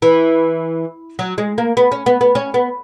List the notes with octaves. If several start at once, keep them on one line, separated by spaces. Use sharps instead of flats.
E3
F#3
G#3
A#3
B3
C#4
B3
B3
C#4
B3